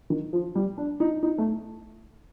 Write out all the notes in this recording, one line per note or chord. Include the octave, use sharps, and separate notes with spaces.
D#3
F3
G3
D4
D#4
D#4
A3